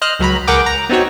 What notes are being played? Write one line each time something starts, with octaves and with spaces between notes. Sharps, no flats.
C5 D#5 F6 F#6
C#2 F#3 A#5 B5
C#2 G#4 A#4 F#5 G5 D6
A#5
B3 C4 D#4 F#4 C#5